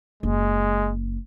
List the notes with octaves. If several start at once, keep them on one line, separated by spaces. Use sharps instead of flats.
F#1 G#3